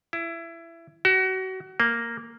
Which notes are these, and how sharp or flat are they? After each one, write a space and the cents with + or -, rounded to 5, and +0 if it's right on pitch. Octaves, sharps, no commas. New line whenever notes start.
E4 +20
F#4 +30
A#3 -5